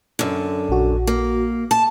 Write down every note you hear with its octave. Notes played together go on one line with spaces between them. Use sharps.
F#2 D3
A#1 F#4
A#3
A5